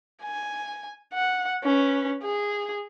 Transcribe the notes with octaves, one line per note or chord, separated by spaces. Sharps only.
G#5
F#5
C#4 B4
G#4